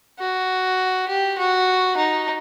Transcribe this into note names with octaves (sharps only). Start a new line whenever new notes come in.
F#4
G4
F#4
D#4